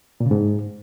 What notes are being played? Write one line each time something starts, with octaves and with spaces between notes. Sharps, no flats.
A#2
C#3
G#2